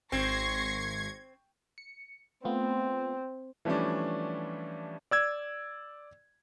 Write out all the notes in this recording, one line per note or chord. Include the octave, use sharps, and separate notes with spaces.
G#1 C4 C#6 G#6 A#6 C7
C#7
A3 B3 C4 F4
E3 F3 G3 A3 C#4 D4
D5 E6 G#6